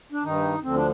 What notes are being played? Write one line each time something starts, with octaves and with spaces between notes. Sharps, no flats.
D4
G2 D#3 D#4
D2 D3 F3 C4
D4